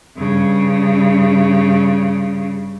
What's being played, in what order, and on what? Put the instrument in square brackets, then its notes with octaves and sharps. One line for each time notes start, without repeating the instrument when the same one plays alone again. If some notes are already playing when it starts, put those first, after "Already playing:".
[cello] G2 C#3